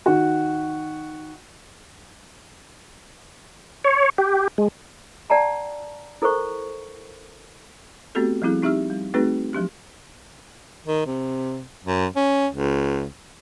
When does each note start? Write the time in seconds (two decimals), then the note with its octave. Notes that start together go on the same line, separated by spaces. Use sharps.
0.06 D#3 F#4
3.84 C#5
4.18 G4
4.58 G#3
5.30 D5 F#5 G5 A5 A#5
6.22 E4 A4 A#4 C5 C#6
8.15 A3 B3 C4 F#4 G4 A4
8.42 F3 G3 C4 E4 G#4
8.63 C4 D#4 G4 E5 E6 F6
8.90 G3
9.14 A3 C4 D#4 F#4 G#4 B4
9.53 F3 F#3 D4 G4
10.86 D#3
11.06 C3
11.84 F#2
12.16 C#4
12.53 C#2